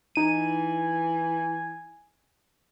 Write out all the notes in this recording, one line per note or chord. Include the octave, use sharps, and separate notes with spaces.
E3 D#4 G#5 D#7